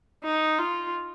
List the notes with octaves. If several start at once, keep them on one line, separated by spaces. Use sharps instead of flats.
D#4
F4